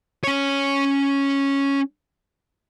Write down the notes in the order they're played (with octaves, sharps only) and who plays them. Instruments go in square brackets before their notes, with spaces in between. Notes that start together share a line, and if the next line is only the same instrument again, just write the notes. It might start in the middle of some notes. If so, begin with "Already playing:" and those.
[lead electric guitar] C#4 C#5